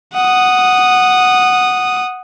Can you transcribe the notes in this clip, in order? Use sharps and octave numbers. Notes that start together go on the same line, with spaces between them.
F#5 D#6